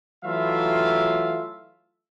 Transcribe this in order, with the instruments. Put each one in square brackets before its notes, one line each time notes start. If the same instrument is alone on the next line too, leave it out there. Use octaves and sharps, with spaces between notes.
[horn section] E3 F#3 A3 F4 E5 F5